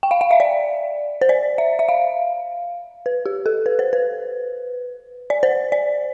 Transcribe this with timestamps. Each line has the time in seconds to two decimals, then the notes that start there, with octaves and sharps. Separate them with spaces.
0.03 G5
0.11 F5
0.21 F5
0.31 E5
0.40 D5
1.21 C5
1.29 D5
1.58 E5
1.79 E5
1.89 F5
3.06 B4
3.26 G4
3.46 A4
3.66 B4
3.79 C5
3.93 B4
5.30 D5
5.43 C5
5.72 D5